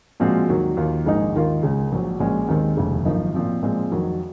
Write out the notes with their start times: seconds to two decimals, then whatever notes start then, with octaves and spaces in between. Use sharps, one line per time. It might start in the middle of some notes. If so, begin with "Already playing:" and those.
0.20 A#2 F3 G#3 C4 F#4
0.49 D#2 D#3 F#3
0.77 D#2 D#3 A#3 F4
1.06 A#1 G#2 D#3 G#3 D#4
1.35 D#2 D#3 A#3 F4
1.62 C#2 C#3 G#3
1.92 A#1 A#2 F#3
2.20 A#1 A#2 G#3 C#4
2.48 D#2 D#3 G#3 C4
2.77 F1 D#2 C#3 G#3
3.05 G#1 F#2 F3 A#3 D#4
3.35 A#2 F3 C4
3.63 A#2 F3 G#3 C4
3.92 F2 D#3 F#3